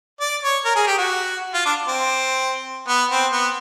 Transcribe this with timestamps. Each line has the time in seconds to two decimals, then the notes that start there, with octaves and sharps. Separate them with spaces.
0.21 D5
0.43 C#5
0.65 A#4
0.76 G#4
0.87 G4
0.98 F#4
1.54 F4
1.65 D4
1.88 C4
2.88 B3
3.10 C4
3.32 B3